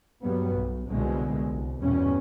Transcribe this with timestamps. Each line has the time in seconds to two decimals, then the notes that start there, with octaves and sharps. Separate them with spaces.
0.23 G2 F#3 G3 B3
0.52 B1
0.86 C2 B2 D3 G#3
1.50 C2
1.81 E2 G2 B2 G3 C#4